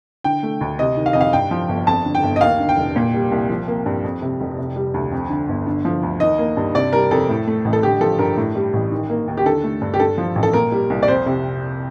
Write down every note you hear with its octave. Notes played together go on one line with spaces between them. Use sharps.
D3 G5
A3
D2
C3 D#5
D#3
F5
F2 D#5
F5
G2 G5
F3
G1
F2 A5
D3
G5
G1
D#5
D#2 F5
D3
G5
F1
A#2
G3
C2
F3
A#3
G2
F2
C3
F1
C3
G3
D2
F2
D3
G1
D3
F3
D2
D#3 D#5
A#3
G2
C3 D5
G3 A#4
F2 A4
A2
A3
A1
A4
D3 G4
F3 A4
G2 A#4
A2
G3
A1
D#3
A#3
D#2
G4
D3 A4
A3
G2
G4
G2 A4
F3
A1
A4
A#2 A#4
G3
C2
D5
F2 C5
C3